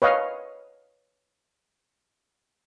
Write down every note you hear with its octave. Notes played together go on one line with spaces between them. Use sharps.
B4 C#5 D#5 F5